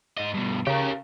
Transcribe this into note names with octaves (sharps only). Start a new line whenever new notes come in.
G#2 D#5
G2 B2
C#3 G4 A#4